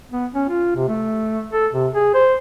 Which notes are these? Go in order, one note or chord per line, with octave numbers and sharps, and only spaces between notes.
B3
C#4
F4
C3
A3
A4
C3
G#4
C5